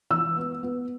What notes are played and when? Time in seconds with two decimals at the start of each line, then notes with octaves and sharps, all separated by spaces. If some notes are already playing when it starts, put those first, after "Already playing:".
0.10 E3 E6
0.37 B3
0.63 B3